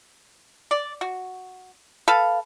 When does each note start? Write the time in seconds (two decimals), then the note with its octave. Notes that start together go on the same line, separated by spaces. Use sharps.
0.71 D5
1.01 F#4
2.08 A4 B4 F5